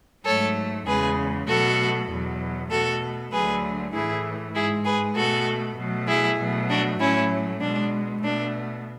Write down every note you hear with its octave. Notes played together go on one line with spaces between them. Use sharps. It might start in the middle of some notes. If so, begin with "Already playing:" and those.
G#2 F#3 A3 A4 C#5
E2 C#3 G#3 G#4 B4
B2 F#3 A3 F#4 A4
E2 B2 F#3
B2 A3 F#4 A4
D2 D3 F#3 A3 G#4 B4
A2 E3 A3 E4 G#4
G#2 G#3 E4 G#4
G#4 B4
B2 A3 F#4 A4
B2 F#3 A3
E4 G#4
B2 F#3 A3
D4 F#4
A2 F#3 A3 C#4 E4
B2 G#3 D4
B2 A3 D4